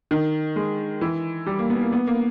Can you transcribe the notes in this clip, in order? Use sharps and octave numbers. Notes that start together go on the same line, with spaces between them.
D#3
G#3
E3
G3
A#3
B3
A#3
B3
A#3